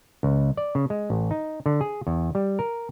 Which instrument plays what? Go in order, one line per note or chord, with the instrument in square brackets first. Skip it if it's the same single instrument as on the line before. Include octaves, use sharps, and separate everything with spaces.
[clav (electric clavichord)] C#2
D5
C#3
G#3
A1
D#4
D3
G#4
E2
G3
A#4